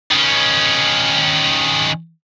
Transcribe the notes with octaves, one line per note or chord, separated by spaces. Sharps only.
D#3 C#4